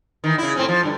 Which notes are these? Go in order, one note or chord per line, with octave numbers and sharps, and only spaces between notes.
D#3 E3
C#3 E4
A2 C4 C#4
F3
G2 D3